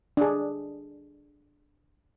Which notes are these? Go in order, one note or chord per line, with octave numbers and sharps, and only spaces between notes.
D4 G#4